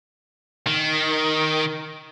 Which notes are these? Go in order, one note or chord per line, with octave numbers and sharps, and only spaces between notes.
D#3